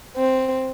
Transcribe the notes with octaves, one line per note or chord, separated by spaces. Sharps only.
C4